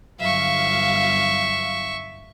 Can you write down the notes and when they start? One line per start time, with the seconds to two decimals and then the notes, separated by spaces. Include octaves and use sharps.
0.20 G1 F#3 E5 F5 C#6